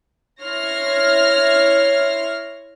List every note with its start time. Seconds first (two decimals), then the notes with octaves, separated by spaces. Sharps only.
0.43 E4 C#5 C6 F6 A#6